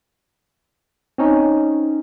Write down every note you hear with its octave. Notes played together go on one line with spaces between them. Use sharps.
C4 C#4 D#4